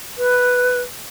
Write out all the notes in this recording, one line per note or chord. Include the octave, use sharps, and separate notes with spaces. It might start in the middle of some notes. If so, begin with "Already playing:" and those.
B4